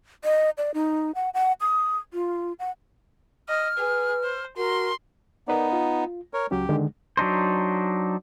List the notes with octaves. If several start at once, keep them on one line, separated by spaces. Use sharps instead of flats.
D#5
D5
D#4
F#5
F#5
D#6
F4
F#5
D#5 F6
G#4 B4
C5
F#4 A#4 C6
B3 D#4 A#4 B4 D5
F4
A#4 C#5
C#2 F#3 C#4 G4
D3 D#3 G#3
F#3 D4 D#4 C5